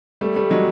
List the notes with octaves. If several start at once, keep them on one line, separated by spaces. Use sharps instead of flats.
G3 A3
G3 A3
F#3 G#3